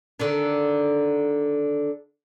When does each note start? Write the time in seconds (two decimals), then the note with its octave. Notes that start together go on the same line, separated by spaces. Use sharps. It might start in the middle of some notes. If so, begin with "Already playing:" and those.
0.20 D3 D#3 D4